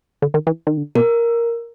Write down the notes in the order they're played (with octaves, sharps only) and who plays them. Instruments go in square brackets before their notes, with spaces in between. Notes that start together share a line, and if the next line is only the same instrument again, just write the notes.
[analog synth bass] D3
D#3
E3
D#3
D3
[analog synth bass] B2 [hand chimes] A#4